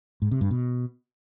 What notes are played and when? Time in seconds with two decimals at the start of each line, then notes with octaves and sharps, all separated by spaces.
0.22 G#2
0.31 C3
0.41 G2
0.51 B2